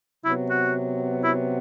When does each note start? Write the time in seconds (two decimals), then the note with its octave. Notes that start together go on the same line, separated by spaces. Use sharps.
0.25 C3 F#3 B3 E4
0.50 F#4
1.24 E4